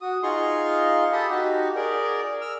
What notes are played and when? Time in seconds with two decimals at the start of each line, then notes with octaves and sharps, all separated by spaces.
0.01 F#4 D#6
0.23 D#4 F4 G#4 F5 C6 C#6
1.13 G4 A4 A5 B5 D#6
1.30 D#4 F#4 G4
1.76 G#4 A#4 D5
2.41 E6 F6